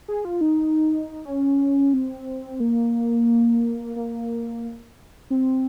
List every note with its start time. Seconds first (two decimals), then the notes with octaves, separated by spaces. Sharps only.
0.08 G#4
0.25 F4
0.41 D#4
1.25 C#4
1.93 C4
2.60 A#3
3.96 A#3
5.30 C4